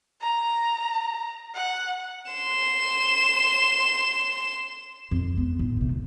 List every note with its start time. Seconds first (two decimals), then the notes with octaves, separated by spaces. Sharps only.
0.21 A#5
1.54 F#5
2.32 C6 E7
5.11 F2
5.38 B3
5.59 A2
5.77 C3 D#3
5.90 E2